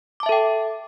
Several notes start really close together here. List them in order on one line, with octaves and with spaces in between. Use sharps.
D6 A5 E5 A4 G5